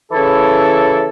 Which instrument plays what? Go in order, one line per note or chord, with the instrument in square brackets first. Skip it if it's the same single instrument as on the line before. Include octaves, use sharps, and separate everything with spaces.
[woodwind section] C#3 E3 E4 A4